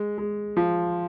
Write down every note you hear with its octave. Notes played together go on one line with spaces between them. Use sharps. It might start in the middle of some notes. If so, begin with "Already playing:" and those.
Already playing: G#3
G#3
F3